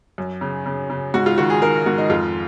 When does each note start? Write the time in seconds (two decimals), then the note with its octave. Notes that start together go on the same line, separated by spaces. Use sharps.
0.18 F#2
0.41 C#3
0.66 C#3
0.90 C#3
1.14 G#2 F#4
1.26 F4
1.38 D#3 F#4
1.50 G#4
1.62 D#3 A#4
1.86 G#2 F#4
1.98 D#4
2.09 F2 F4